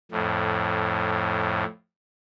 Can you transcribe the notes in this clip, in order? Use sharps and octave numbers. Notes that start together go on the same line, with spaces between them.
F2 A2